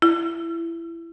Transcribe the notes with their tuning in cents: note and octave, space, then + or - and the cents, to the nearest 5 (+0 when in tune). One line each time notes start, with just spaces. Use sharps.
E4 +20